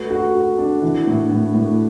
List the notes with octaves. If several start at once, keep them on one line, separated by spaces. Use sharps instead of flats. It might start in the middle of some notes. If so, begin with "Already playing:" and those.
Already playing: A3 F#4 B4
F#4
F#4
D4
E3
A2
A2
A2